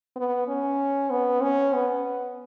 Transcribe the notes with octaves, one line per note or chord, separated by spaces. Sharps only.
B3
C#4
B3
C#4
B3